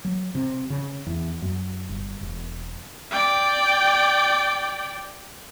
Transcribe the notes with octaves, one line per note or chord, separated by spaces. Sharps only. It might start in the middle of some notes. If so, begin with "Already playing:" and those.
F#3
C3
C#3
E2
F#2
G1
E1
D5 G5